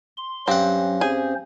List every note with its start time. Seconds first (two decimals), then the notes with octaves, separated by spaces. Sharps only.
0.17 C6
0.48 G2 F#3 C4 C#4 F#5
1.01 C4 C#4 G#4 C5